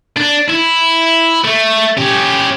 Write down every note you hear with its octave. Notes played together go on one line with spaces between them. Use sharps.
D4
E4
A3
C#4 G4